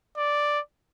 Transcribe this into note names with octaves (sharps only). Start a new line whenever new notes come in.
D5